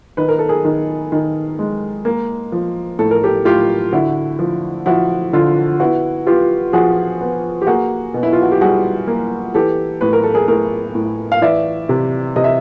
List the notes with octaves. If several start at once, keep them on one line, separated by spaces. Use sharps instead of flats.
D#3 B4
A#4
A4
G#4 A#4
D#3
D#3
G#3
A#3
F3
A2 A4
A#4
G4 A4
A2 F4 G4
D3 E4 F#4
F3
F3 E4 F#4
D3 F4
B3 E4 F#4
B3 F4 G4
F3 F#4 G#4
B3
G4
A#3 F#4 G#4
B2
E4
F4
F#4
G4
G3 F#4 G#4
A#3
E3 G4 A4
A2 B4
A#4
A4
G#4 A#4
A2 G#4 A#4
A2
F5
E3 D5 E5
C3
C3 D#5
E5